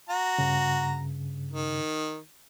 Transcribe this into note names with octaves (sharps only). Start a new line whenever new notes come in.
F#4 A#5
G2 C#3
D#3